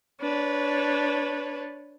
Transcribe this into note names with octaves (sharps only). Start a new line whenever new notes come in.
D4 B4 C#5